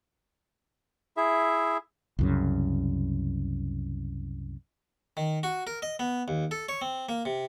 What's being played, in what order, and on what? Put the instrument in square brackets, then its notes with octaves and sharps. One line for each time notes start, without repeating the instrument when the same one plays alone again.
[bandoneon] E4 G#4 E5
[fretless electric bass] C2 F#2 C#3
[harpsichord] D#3
F#4
A#4
D#5
B3
D#2
A4
C#5
C4
A#3
C3